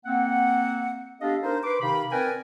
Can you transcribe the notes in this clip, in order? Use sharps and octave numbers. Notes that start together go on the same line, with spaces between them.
A#3 C4 F#5
B3 D4 G4 A4 D#5 F5
D4 D#4 A#4 C5
B4 C6 D6
C3 D#3 D#4 F5 B5
C4 A#4 B4 D5 G5 G#5